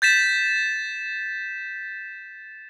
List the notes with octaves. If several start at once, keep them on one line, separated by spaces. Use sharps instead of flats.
G6 A6 B6 E7